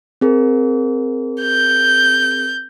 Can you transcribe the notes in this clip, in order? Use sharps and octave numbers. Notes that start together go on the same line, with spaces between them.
C4 G#4 A#4
G6